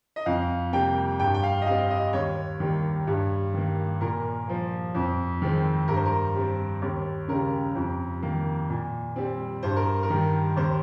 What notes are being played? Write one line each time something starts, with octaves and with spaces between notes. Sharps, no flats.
D#5
F2 F5
C3 G3 A#3 G5
G2 G5
G5
F5
D#5
G3 C4 F5
D#5
D#2 C#5
D#3 G3 A#3
G2
D#3 A#3
A#2 A#4
F3 A#3
F2
D#3 G#3 C4
G2 A#4
C5
A#4
G3 C4
D#2
C#3 G3 A#4
F2
D#3 A#3
A#2
G3 C4
G2 C5
A#4
A#4
D#3 G3
D#2 C5